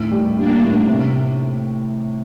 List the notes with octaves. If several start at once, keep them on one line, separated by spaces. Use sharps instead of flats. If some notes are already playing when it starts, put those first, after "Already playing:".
Already playing: D#2 A2
G3
G3 A#3 D4
A2
C3